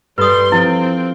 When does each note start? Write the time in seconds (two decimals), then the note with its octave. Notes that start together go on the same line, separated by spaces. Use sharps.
0.18 G2 G3 A4 B4 C6 D#6 G6
0.52 F3 C4 E4